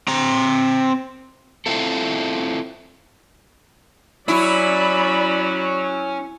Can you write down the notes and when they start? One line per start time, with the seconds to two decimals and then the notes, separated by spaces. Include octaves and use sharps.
0.08 C4 A#5
1.66 C4 E4 F4 A4
4.28 F#3 C#4 E4 D5 B5